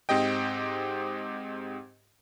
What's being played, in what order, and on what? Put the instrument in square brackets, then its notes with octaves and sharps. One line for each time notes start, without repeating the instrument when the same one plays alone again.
[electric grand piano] G#2 C4 G4 D#5 G5